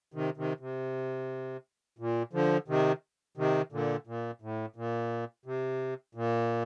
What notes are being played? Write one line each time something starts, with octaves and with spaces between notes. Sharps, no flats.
C3 D#3
C3 D#3
C3
A#2
D3 F3
C3 D#3
C3 D#3
A#2 D3
A#2
A2
A#2
C3
A#2